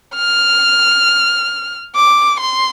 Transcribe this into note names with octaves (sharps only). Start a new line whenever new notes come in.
F6
D6
C6